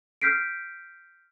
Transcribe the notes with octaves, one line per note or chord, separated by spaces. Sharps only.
F6 G6 B6 C7 D7